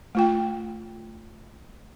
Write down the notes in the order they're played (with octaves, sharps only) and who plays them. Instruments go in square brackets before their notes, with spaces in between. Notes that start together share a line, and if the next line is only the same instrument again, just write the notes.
[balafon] A3 F4 G5